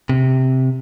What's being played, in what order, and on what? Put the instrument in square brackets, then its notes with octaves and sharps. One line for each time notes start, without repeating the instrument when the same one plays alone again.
[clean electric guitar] C3